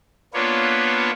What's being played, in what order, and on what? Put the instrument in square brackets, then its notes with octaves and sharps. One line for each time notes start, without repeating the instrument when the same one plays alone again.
[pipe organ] A#3 B3 D4 F4 B4 C#5